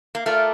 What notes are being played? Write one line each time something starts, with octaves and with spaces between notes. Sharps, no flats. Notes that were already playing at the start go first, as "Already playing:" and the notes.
A#3
A3 F4 A#4 D5 F5